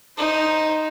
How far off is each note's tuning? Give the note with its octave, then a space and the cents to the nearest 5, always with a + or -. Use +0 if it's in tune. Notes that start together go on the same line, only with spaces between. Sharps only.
D#4 +0 C5 +0